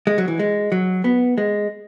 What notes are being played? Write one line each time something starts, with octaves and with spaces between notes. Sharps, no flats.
G#3
F#3
E3
G#3
F#3
B3
G#3